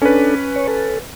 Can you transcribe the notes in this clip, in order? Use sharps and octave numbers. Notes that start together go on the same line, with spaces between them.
C#4 D4 A4 B4
C#5
A4